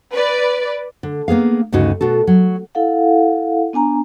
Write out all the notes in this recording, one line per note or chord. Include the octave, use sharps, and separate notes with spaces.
B4 D5
D3
A#3 B3 G#4 F5
D2 G2 C#3 D#4 F#4
B2 F#4 A4
F#3
E4 A4 F5 F#5
B3 D4 G#5 A#5